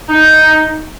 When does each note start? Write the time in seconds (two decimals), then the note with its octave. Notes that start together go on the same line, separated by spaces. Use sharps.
0.09 D#4